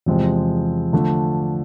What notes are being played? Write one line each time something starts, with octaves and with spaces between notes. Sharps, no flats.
E2 C3 F3 G#3 C4
D3 F3 A3 D4